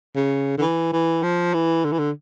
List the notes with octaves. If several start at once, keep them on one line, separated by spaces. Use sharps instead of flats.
C#3
D3
E3
E3
F3
E3
D3
E3
D3